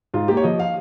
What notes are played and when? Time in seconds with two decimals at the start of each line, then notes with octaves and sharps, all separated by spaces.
0.14 G#2 F4
0.28 A#3 G4
0.37 C#5
0.44 F3 D#5
0.59 F5